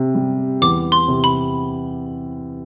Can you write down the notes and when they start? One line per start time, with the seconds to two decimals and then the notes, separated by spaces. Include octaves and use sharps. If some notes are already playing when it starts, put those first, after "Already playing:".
Already playing: C3
0.15 G3
0.62 E2 D6
0.92 C6
1.08 C3
1.24 B5